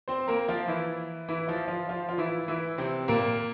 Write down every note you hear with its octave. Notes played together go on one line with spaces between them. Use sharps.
C4 C5
A#3 A#4
F3 F4
E3 E4
E3 E4
F3 F4
F3 F4
F3 F4
F4
E3 E4
E3 E4
C3 C4
A#2 A#3